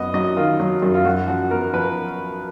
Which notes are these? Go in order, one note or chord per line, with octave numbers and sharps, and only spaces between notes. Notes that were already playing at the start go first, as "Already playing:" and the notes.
Already playing: F#2 B3 D#5
F#3 D#5
D#3 F4
F#3
F#2
F4
F#2 F#4
F3 F#4
B3 A#4
F3 B4